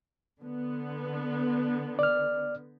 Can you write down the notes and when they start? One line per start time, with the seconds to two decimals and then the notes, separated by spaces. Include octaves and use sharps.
0.39 D3 B3
1.99 D5 F6